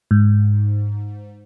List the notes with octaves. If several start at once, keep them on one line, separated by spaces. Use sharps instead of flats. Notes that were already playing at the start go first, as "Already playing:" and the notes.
G#2